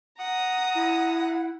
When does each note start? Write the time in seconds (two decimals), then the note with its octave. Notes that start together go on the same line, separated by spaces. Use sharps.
0.20 F#5 A#5 D#6
0.75 E4